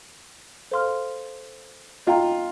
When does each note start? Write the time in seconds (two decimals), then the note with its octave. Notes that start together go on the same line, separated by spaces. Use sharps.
0.71 A4 C5 F5 C6 F6
2.07 F4 D#5 G5 A#5